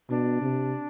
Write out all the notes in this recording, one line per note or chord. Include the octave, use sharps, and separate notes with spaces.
B2 D4
C3